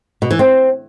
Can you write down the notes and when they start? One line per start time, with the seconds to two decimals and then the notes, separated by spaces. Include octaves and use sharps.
0.22 B2
0.31 E3
0.39 C4